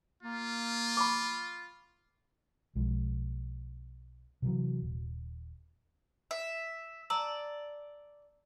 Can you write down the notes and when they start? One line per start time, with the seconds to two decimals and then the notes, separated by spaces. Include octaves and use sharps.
0.23 A#3 F4
0.97 B5 C#6 D6
2.75 B1 F3 G#3
4.42 C3 E3 F#3
4.82 D#1
6.31 E5
7.10 D5 A5 A#5 E6